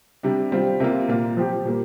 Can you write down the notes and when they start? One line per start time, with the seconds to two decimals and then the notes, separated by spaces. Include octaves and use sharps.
0.23 C3 G3 D4
0.52 G3 C4 F4
0.80 C3 A#3 F4
1.08 A#2 A#3 F4
1.37 F3 C4 G4
1.65 A#2 G3 A#3